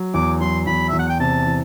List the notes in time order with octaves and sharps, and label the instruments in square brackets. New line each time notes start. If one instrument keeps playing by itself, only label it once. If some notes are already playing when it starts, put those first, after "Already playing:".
Already playing: [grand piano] F#3
[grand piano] E2 [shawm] D6
[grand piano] F#3 [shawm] C6
[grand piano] E2 [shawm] B5
[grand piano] E2 [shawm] E5
[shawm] F#5
G5
[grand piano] C3 [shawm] A5
[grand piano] E3